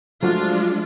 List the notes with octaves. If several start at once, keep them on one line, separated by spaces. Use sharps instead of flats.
F3 F#3 G#3 A3 D4 F4 F#4